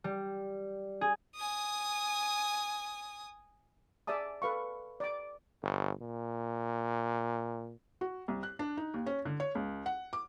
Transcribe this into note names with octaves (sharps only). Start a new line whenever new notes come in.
G3
G#4
G#5 D#6
G#4 D5 E5 A5 D#6
A4 B4 F5 C#6
D5 D6
G1
A#2
F#4
C2
F#6
D4
D#4
D#2
C#4
D3
C#5
C#2
F#5
D6